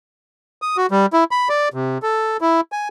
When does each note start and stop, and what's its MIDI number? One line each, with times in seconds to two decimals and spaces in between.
0.62 0.77 87
0.77 0.86 66
0.91 1.06 55
1.13 1.24 64
1.31 1.49 83
1.49 1.69 74
1.74 1.98 48
2.03 2.37 69
2.41 2.61 64
2.72 2.88 80